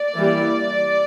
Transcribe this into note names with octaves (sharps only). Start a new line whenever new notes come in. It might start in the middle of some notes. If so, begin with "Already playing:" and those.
Already playing: D5
E3 G3 A#3